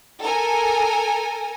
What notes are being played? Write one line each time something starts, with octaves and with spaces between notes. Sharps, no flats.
A4 A#4 G#5